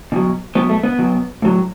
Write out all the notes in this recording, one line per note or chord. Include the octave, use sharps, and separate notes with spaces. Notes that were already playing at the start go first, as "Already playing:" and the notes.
B2 F#3
B2 F#3 B3
A3
B3
B2 F#3
A2 F#3